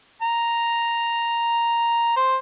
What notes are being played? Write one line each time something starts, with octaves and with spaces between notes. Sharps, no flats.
A#5
C5